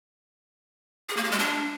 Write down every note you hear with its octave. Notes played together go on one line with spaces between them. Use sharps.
G#4
A#3
G4
G#3
D4